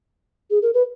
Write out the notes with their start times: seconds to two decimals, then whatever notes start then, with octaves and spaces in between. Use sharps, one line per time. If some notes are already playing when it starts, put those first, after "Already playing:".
0.51 G#4
0.62 A#4
0.74 B4